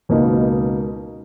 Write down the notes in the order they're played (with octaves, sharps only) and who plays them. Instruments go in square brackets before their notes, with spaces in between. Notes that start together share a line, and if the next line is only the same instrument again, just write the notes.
[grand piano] C#2 B2 A#3 D#4